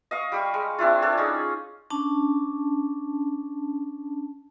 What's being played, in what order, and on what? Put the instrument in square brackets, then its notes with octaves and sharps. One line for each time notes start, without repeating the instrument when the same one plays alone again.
[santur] D#5 F5 C#6
G3 G4 C#6
G#3
C4 D4 E4 F4
D4 A4 C#5 D5
C#4 D#4 G#4
[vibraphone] C#4 D4 A5